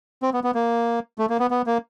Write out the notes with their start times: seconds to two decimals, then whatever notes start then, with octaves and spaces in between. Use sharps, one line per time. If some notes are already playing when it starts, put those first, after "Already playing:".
0.22 C4
0.33 B3
0.44 B3
0.55 A#3
1.18 A3
1.30 A#3
1.40 B3
1.51 B3
1.67 A#3